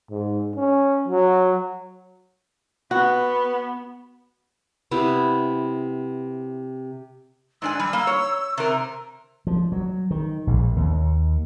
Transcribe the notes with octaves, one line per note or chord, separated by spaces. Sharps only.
G#2
C#4
F#3
B3 F#4
C3 B3 E4
G#2 D4 G#5 E6
G3
A#3
C#5
C3 A#4
F3
F#3
D#3
A#1
D#2